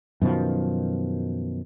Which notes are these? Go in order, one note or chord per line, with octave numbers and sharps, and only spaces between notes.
F#2 B2 D#3 F3